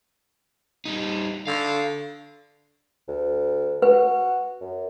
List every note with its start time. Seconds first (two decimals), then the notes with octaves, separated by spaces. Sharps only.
0.85 G3 D#4
1.47 D3 F5
3.08 D2
3.82 F#4 B4
4.61 F#2